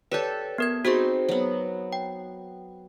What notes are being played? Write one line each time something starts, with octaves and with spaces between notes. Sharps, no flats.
G4 A4 B4 C#5 D5
B3 A#4 G#6
C4 D#4 F#4 G#4 C6
F#3 B3
G5